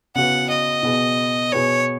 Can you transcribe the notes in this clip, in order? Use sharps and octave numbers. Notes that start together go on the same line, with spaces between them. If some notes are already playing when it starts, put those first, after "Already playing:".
C#3 B3 F#4 B4 F#5
D#5
B2 B3 G#4 B4
B2 B3 G#4 B4 C#5